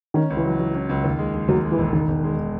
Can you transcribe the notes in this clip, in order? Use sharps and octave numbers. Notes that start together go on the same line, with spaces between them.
D#3 C#4
C#2
E3
F#3
F#3
C#4
C#2
D#2
G#3
G#3
D#2 F#3
G#3
E3
E1
E1 D#3
E1
G#3